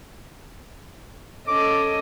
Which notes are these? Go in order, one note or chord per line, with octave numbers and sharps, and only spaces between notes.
C#4 A4 D#5 D6